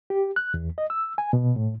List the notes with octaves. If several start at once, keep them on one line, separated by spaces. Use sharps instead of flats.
G4
F#6
E2
D#5
E6
G#5
B2
A2